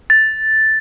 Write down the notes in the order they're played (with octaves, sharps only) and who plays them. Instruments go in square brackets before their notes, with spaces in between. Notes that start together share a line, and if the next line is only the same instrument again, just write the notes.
[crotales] A6